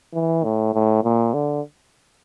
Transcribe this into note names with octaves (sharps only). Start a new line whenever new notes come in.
E3
A2
A2
A#2
D3